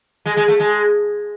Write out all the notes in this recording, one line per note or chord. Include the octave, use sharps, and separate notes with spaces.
G#3
G#3
A3
G#3